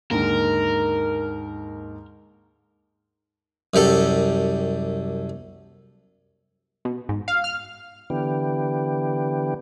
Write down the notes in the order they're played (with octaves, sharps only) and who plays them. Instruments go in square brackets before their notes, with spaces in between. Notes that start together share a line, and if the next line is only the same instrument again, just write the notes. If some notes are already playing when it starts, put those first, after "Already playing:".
[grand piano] D#2 G#2 D3 [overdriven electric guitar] A#4
[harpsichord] C2 F#2 G4 A4
[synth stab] B2
G#2
F5
F6
[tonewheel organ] D3 E3 B3 G4